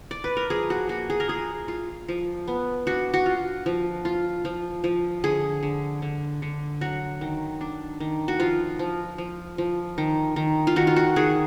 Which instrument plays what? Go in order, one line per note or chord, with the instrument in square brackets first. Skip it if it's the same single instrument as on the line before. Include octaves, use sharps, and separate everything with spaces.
[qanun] D5
B4
A#4
F3 G#4
F#4
A#3 F#4
G#4
A#4
F4 G#4
F4
F3
B3
D4 F#4
F#4
F4
F3
F4
F3
F3
D3 G#4
D3
D3
D3
F#3 F#4
D#3
D4
D#3
F#4
F3 F4
F3
F3
F3
D#3
D#3
F4
D#3 F#4
F4
F#4
D#3 G#4